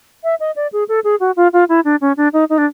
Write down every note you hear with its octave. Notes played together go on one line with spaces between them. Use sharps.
E5
D#5
D5
G#4
A4
G#4
F#4
F4
F4
E4
D4
C#4
D4
D#4
D#4
D4